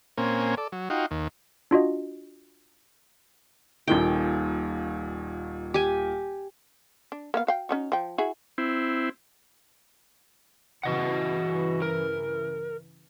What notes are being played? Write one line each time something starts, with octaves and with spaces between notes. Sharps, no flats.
A#2 A#3 C4 C#4 G#5
A4 D5
F#3
D#4 F4 F#4 G5
D#2
D4 F4 F#4 D#5
D#1 A#2 D#3 G5
G4 G#5
D4
A#3 B3 F5
F#4 F5 G5
C#4 D#4 F#4
F3 G5
E4 F#4 G#4
C4 E4
G2 C#3 E3 F#4 D#5 F#5
A#4